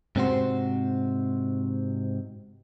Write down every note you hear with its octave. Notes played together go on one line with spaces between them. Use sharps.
G#2 C3 C4 C#4 F#4 C5